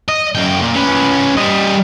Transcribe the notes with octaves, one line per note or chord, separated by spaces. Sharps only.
D#5
F#2 G5
A#2
C#4 B4
G3 D#5